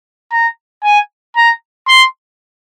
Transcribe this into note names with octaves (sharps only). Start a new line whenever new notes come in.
A#5
G#5
A#5
C6